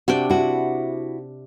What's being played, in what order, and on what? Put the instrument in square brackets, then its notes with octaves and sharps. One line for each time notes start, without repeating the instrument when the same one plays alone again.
[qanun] C3 D4 G5 [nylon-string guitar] F#4
[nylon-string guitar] E4 F#4